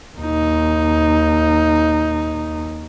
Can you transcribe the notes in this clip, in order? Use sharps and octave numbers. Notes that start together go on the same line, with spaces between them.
D#2 D#4